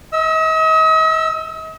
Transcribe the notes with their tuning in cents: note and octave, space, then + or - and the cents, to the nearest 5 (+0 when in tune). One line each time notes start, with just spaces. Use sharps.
D#5 +40 E6 +0